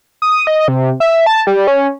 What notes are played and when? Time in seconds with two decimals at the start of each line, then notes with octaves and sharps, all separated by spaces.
0.22 D#6
0.47 D#5
0.68 C3
1.00 E5
1.26 A5
1.47 G3
1.67 C#4